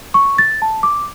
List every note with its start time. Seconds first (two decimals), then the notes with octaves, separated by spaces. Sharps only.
0.14 C#6
0.38 A6
0.62 A5
0.83 D6